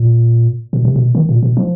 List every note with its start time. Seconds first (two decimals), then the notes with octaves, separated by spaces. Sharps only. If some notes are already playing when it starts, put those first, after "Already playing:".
Already playing: A#2
0.73 B2
0.85 C3
0.96 B2
1.15 D#3
1.29 A#2
1.43 B2
1.57 F3